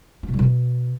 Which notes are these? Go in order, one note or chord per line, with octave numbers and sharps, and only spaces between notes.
B3
B2
G3
B2